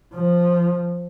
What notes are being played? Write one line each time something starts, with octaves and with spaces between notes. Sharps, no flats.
F3